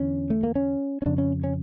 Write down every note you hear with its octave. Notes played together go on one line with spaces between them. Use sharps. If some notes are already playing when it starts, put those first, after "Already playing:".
Already playing: E2 D3 C#4
A3
A#3
C#4
C#4
F2 C#3 D4
C#4
C#4